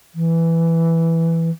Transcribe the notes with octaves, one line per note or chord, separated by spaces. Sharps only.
E3